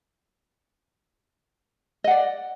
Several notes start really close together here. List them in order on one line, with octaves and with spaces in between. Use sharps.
D#5 F#5 D5